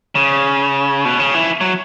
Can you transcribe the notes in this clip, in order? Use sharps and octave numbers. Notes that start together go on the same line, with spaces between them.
C#3
B2
C#3
E3
F#3